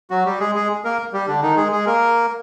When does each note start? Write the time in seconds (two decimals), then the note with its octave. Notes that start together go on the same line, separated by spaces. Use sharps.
0.10 F#3 F#4
0.26 G3 G4
0.40 G#3 G#4
0.55 G#3 G#4
0.85 A#3 A#4
1.13 G3 G4
1.27 D3 D4
1.42 D#3 D#4
1.57 G#3 G#4
1.72 G#3 G#4
1.86 A#3 A#4